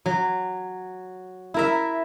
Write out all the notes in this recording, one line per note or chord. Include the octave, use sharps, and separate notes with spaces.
F#3
E4 A#4 E5